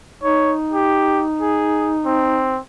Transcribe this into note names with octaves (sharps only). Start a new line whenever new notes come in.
D#4 C#5
G4
G#4
C4